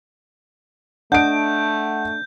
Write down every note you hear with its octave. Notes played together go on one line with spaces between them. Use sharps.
A3 D4 D#5 F#5 G6 D7